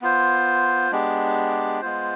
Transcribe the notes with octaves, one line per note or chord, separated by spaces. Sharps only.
B3 F4 C5
G#3 B3 D4 G4
G#3 B3 F4 C5